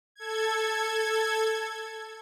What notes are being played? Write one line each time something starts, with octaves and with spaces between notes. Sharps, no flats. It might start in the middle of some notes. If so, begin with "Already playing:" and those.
A4 G#6